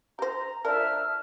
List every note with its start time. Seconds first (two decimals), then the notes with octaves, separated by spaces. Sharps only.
0.19 G4 C5 A#5
0.65 F3 D4 A#4 E5 F6